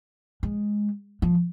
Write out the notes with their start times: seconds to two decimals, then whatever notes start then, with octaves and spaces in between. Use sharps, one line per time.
0.43 G#3
1.22 F3